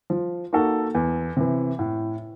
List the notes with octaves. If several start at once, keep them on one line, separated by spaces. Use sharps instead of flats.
F3
A#3 D#4 F#4 A4
E2
C3 E3
A2